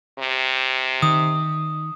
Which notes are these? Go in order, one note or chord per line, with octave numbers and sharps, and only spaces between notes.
C3
D#3 D#6